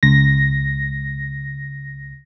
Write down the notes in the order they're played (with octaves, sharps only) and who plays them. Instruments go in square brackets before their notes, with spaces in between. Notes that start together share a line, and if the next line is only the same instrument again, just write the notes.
[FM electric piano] C#2 A#6